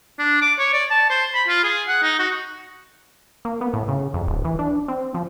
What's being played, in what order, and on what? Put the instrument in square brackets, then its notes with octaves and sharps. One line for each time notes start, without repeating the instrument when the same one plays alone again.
[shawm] D4
D6
C#5
D5
A5
C5
B5
F4
G#4
F#5
D#4
F#4
[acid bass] A#3
B3
A2
C#3
F2
D1
E3
D4
C4
F3